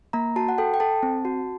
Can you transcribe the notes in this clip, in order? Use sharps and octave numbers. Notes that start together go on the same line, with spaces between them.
A#3 A#5
F#4 A5
F#5
A4 G5
G5
A4 A5
C4
F#4